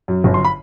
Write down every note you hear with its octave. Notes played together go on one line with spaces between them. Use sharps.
F#2
G1
C6
B5